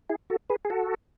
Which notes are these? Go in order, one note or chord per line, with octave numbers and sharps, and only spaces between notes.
E4 G#4
F#4 A4
G#4 B4
G#4
F#4 A4